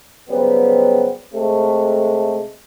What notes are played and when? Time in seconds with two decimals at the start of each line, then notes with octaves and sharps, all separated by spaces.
0.28 C#3 F#3 G3 B3 C4
1.33 C3 G#3 A3